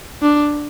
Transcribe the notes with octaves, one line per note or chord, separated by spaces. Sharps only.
D4